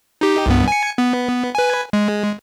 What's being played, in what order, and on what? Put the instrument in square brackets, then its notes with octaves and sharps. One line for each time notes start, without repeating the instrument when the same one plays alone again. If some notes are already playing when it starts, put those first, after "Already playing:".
[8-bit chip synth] D#4 G4
C2 G2 B3
G#5 C#7
B3
B4 G#5
G#3